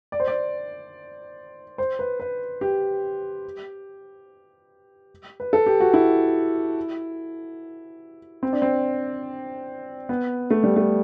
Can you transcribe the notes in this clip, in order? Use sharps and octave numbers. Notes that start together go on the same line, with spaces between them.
D5
C5
D5
C5
B4
B4
G4
B4
A4
G4
F#4
E4
C4
D4
C4
B3
A3
G3
A3